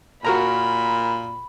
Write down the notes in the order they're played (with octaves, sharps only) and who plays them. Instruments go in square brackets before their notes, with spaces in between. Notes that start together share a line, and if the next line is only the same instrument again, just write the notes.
[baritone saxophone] A#2 [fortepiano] F#4 A#4 A#5 [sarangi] B5